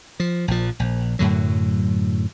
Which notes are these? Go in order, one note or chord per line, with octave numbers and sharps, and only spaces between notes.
F3
A#1 F3
A#1
F#2 A2 D3 F#3